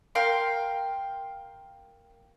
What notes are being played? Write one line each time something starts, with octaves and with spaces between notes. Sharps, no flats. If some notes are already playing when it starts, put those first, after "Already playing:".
A#4 F5 G5 C6